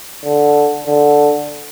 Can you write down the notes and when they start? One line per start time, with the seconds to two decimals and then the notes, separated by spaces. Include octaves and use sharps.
0.25 D3
0.87 D3